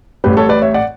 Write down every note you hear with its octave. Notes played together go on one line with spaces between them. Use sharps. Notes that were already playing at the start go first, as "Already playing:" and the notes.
A1 A2 G3 G4 B4
A4 C#5
B4 D5
C#5 E5
D5 F#5